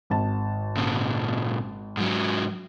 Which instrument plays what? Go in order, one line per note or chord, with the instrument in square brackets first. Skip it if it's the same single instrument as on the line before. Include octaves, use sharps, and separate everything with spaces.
[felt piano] G#1 A5
[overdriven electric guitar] A#2 C#3
G#2 F#3